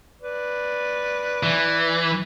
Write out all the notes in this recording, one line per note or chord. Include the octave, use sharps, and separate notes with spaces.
B4 D5
E3